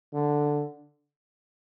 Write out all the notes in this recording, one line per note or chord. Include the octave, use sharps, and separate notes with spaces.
D3